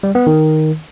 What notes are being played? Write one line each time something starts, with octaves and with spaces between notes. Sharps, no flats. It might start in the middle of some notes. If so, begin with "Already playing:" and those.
G3
B3
D#3